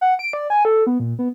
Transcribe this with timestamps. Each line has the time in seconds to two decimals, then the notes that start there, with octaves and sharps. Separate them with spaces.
0.01 F#5
0.19 D7
0.33 D5
0.50 G#5
0.65 A4
0.87 B3
1.00 A#2
1.19 B3